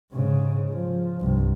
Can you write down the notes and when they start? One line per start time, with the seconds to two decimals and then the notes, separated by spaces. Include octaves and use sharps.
0.12 G#2 C#3
0.71 F3
1.20 C2 G2